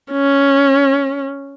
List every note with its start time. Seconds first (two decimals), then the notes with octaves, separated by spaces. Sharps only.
0.12 C#4